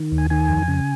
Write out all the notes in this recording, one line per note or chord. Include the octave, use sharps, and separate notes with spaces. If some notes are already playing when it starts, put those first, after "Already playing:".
Already playing: D#3
D#2
G#5
D#3 G#5
F2
C#3